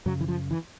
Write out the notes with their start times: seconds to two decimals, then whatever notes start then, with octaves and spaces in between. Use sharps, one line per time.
0.06 F#2 C#3 F#3
0.21 E3
0.28 F3
0.51 E3